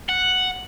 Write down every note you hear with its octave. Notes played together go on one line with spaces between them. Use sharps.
F#5